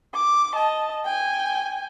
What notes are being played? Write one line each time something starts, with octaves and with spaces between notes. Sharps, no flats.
D6
D#5 A5
G5 G#5